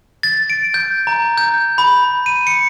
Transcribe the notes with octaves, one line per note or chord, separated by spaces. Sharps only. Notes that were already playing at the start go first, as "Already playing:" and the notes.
A6
D7
G6
A#5
G6
B5
D#7
C#7